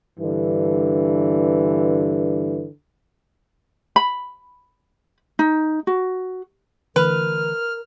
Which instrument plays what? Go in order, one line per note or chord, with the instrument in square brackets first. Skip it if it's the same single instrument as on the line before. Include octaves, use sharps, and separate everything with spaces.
[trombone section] G2 D3 E3
[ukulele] B5
D#4
F#4
[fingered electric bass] D3 E3 A3 [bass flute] A#4 [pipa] B4 [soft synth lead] F6